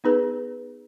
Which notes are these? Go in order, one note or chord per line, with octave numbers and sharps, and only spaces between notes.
B3 D#4 G#4 B4